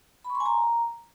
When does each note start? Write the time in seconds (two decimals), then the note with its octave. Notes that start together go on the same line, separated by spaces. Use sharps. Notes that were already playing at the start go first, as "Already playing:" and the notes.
0.24 B5
0.30 C#6
0.35 C6
0.40 G#5
0.46 A#5